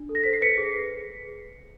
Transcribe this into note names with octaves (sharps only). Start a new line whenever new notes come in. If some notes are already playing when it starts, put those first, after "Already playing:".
Already playing: D4
A4
A#6
C5 B6
C7
B4 B6 C#7
G#4
B4